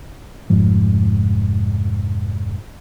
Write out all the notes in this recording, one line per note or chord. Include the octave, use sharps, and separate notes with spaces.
F1 G#2 F3